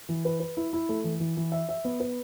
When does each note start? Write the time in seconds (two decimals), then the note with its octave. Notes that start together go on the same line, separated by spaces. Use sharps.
0.09 E3
0.25 B4
0.40 B4
0.57 E4
0.73 E4
0.89 A3
1.04 E3
1.20 E3
1.37 E3
1.52 E5
1.69 E5
1.84 B3
2.00 B4